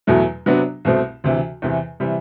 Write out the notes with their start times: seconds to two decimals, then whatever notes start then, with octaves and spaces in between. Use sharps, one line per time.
0.07 E2 B2 F#3 A3
0.46 C3 F#3 B3 D4 F#4
0.85 C2 B2 A3 C4
1.24 D2 C3 E3
1.62 E2 C3 E3
2.00 C3 E3 G3